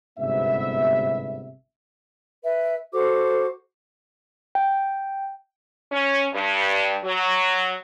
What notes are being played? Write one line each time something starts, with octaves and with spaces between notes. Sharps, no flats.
G1 G#2 C3 B3 E5
B4 E5
F#4 A4 C5 D6
G5
C#4
G2
F#3